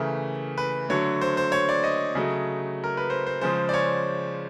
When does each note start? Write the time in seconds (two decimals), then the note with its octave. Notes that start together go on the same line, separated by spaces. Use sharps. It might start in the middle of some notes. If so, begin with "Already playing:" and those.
Already playing: C#3 E3 A3 A#4
0.58 B4
0.89 D3 F#3 A3 C#5
1.21 C5
1.37 C5
1.52 C#5
1.69 D5
1.84 D#5
2.15 C#3 F#3 A3
2.84 A#4
2.97 B4
3.10 C5
3.27 C5
3.41 C#3 F3 G#3 C5
3.69 D5
3.74 C#5